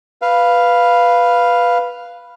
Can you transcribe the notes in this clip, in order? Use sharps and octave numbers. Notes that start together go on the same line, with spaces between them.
B4 F5